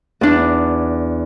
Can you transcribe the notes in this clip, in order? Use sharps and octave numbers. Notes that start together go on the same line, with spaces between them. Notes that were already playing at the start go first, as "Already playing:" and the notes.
E2 D4